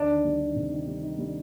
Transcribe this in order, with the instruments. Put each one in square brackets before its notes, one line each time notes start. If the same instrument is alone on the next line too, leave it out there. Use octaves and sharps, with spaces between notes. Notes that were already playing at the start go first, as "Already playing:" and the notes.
Already playing: [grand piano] D2 [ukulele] D4
[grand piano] D#3
G3
D#3
C3
D#3
G3
D#3
G3